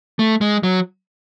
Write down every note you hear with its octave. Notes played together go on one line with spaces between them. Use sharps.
A3
G#3
F#3